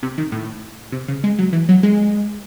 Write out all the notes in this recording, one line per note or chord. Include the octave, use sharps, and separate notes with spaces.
C3
D#3
A2
C3
C#3
G#3
F#3
E3
F#3
G#3